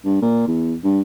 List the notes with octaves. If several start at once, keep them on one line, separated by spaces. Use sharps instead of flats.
G2
A#2
E2
G2